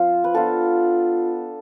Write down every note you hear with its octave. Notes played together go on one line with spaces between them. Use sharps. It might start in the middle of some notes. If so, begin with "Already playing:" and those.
Already playing: F3 C4 F4 C5
B4
B3 D4 F4 A4